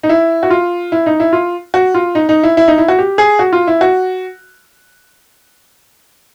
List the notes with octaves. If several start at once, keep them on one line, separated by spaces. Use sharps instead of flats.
D#4
E4
F#4
F4
E4
D#4
E4
F4
F#4
F4
D#4
D#4
E4
E4
D#4
E4
F#4
G4
G#4
F#4
F4
E4
F#4